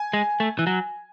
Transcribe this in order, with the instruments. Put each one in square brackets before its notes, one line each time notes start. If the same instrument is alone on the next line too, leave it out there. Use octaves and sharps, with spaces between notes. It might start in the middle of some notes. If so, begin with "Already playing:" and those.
Already playing: [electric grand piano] G#5
[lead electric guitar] G#3
A3
E3
F#3